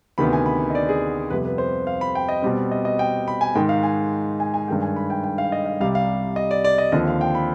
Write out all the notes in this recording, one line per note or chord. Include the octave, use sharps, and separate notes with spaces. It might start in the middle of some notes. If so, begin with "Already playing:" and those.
D2 C3 D#3 B3 B5
G#5
B5
D#5
D5
G#4
F2 C3 G3 B3 B4
B4
C5
F5
B5
G5
D#5
B2 G3 C4
D#5
D#5
G5
B5
G#5
G#2 D#3 G#3 G5
F5
G#5
G#5
G#5
G2 D#3 G#3 G5
G#5
B5
G5
G5
F5
D#5
F5
C2 C3 G3 F5
F5
D#5
D5
D5
D#5
D#2 D3 F3 C4 D#5
F5
G5
B5